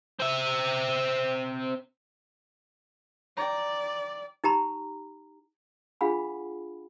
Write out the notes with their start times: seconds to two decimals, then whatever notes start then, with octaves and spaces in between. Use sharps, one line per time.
0.19 C4 E5
3.37 D5 G5 A#5
4.44 D#4 G4 A#5 B5
6.01 D4 F4 G#4 F5 F#5 B5